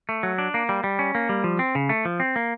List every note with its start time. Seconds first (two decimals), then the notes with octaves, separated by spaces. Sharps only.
0.09 A3
0.23 F#3
0.38 D4
0.54 A#3
0.69 G3
0.84 G3
0.99 C#4
1.15 A#3
1.29 G3
1.44 F3
1.59 C4
1.75 C#3
1.89 A3
2.05 F3
2.20 C4
2.36 A#3